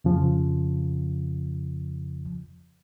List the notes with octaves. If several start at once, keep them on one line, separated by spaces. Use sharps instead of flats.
F2 C#3 F3